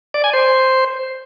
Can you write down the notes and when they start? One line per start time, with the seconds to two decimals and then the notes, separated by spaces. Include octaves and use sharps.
0.14 D5
0.24 G#5
0.33 C5